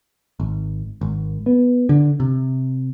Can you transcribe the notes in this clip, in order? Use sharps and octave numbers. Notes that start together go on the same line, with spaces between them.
G#1
G#1
B3
D3
C3